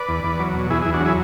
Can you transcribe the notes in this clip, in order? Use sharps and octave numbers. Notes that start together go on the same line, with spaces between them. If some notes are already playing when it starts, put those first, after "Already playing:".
Already playing: B4 D5
E2
E2
F#3
B2
E2 E4 G#4
E2 E4 G#4
D4 F#4
F#3 E4 G#4